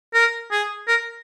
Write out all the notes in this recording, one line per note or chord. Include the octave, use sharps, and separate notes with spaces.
A#4
G#4
A#4